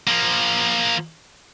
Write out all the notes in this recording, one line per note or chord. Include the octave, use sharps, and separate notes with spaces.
F3 A#3